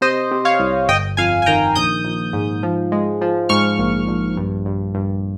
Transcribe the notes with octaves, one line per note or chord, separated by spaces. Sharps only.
C3 C5 D#5
C3
C#5 F5
C2
G1 D#5 G5
F2 F5 G#5
G#5
D#3 G5 A#5
A#1 D#6 G6
A#1
G#2
F3
G#3
F3
G#2 C#6 F6
A#1
A#1
G2
G2
G2